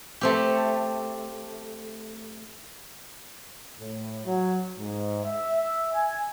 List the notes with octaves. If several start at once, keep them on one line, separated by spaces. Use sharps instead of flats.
A3 C4 G4
A2
F#3
G#2
E5
G#5